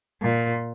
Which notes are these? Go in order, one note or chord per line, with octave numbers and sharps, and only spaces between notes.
A#2